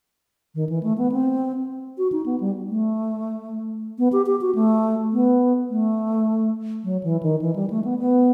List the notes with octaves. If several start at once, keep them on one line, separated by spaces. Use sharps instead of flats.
D#3
E3
A3
B3
C4
F#4
D#4
B3
G3
A3
B3
G4
G4
F#4
A3
B3
A3
F#3
E3
D#3
E3
G3
A3
B3
B3